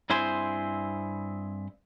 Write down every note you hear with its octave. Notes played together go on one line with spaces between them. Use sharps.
G2 C4 E4 G#4 C5